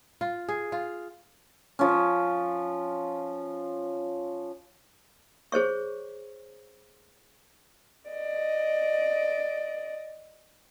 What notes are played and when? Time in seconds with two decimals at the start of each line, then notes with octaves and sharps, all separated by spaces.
0.21 F4
0.49 G#4
0.72 F4
1.79 F3 C#4
5.52 G#4 C5 C#5 C#6
8.11 D5 D#5